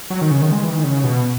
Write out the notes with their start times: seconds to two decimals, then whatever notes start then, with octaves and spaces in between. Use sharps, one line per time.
0.10 F#3
0.21 D#3
0.31 C#3
0.42 D#3
0.52 G#3
0.63 E3
0.73 D#3
0.84 C#3
1.04 B2